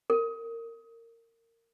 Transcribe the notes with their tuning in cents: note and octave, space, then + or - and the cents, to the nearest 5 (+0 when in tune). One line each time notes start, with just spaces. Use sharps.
A#4 -25